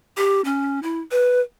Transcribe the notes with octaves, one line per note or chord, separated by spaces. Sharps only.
G4
C#4
E4
B4